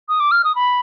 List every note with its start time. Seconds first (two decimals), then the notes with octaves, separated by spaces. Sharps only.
0.09 D#6
0.20 D6
0.31 F6
0.44 D#6
0.55 B5